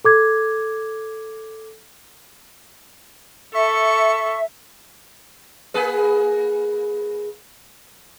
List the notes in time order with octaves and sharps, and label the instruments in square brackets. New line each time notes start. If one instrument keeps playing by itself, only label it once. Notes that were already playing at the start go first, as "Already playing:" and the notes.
[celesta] A4 D6 G#6
[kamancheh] A4 [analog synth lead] E5 [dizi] C#6
[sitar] A#3 G#4 B4